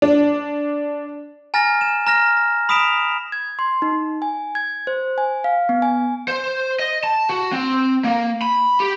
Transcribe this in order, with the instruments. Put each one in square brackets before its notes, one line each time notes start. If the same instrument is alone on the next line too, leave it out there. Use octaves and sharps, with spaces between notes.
[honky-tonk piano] D4
[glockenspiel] G#5 A#5 F6 A6 A#6
E7
A#5 F6 A#6
A#6
B5 D#6 B6 D7 E7 F7
[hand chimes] G#6
C6
D#4
G#5
G#6
C5
G#5
F5
B3
G#5
[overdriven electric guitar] C5
D#5
A5
F#4
C4
A#3
B5
G4